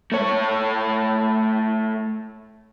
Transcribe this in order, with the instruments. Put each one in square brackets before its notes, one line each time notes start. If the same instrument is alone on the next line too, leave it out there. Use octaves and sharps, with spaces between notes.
[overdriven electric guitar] A3 C#5